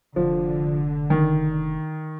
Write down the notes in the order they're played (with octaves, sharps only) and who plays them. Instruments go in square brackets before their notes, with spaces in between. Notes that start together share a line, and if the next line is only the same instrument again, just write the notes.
[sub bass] F1 [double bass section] D3 [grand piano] F3
[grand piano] D#3